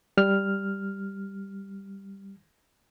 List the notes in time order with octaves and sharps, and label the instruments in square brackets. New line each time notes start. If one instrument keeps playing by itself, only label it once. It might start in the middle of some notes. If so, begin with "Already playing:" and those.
[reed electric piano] G3 F6